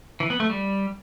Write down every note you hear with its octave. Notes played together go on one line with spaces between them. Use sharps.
E3
B3
A3
G3